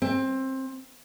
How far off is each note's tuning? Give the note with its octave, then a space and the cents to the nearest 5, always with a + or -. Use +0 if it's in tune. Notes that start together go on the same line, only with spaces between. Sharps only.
C4 +20